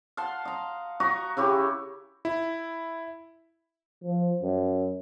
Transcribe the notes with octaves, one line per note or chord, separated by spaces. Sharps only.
F5 F#5 A5 C6
D#5 A#5
F#4 D#5 A#5 C#6
C#3 E4 F#4 G4
E4
F3
F#2